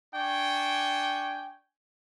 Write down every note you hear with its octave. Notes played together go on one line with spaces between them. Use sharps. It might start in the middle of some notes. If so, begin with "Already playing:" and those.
D4 G5 G#5 C#6